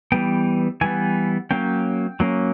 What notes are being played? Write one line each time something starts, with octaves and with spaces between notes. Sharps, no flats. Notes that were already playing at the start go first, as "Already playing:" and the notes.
E3 G3 B3 G5
E3 G3 B3 G#5
F#3 A#3 C#4 G5
F#3 A#3 C#4